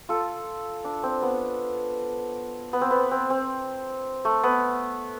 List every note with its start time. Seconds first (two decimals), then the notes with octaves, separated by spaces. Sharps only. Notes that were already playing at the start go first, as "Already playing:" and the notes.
0.09 F4 A4
0.85 D4
1.03 C4
1.22 B3
2.73 B3
2.81 C4
2.91 B3
3.11 C4
3.30 C4
4.25 A3
4.43 B3